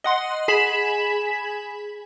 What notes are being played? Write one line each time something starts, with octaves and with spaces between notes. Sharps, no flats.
D#5 F#5 C6
G#4 G#5 B5 B6 E7 F#7